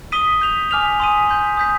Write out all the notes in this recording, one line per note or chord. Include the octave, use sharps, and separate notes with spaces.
D#6 B6 D#7 G7
G6 B6 F7
G#5 D6 F6 B6 F7
G#5 C6 D#6 B6 D#7
C6 G6 B6
D#6 G6 B6